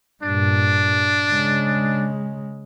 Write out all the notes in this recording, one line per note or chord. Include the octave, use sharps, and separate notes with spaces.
G2 A#2 D4
C#3 G#3